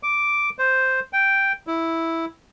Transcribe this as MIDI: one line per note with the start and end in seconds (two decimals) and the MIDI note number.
0.03 0.50 86
0.59 1.00 72
1.13 1.52 79
1.67 2.25 64